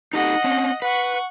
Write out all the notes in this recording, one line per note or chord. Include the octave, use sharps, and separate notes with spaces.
D#4 G4 A4 D#5 F#5
C4 C#4
B4 F#5 C#6